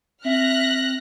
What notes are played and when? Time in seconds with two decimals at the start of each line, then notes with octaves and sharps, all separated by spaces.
0.25 C4 E5 F6 F#6 A#6